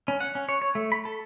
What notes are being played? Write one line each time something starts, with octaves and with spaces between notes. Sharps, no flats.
C#4
F#5
C#4
C#5
C#5
A3
B5
A4